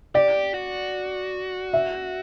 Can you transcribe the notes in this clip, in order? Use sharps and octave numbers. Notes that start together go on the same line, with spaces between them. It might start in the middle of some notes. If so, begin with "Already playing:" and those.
G4 D5
F#4
E5